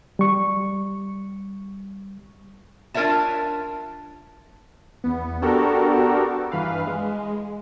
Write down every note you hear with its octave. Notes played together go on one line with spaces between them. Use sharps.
G3 C#6
D4 F4 A#4 C#5 E5 A5
E2 B3
B3 D4 F#4 G4 A4 A#4
G2 E3 B4 F5
G#3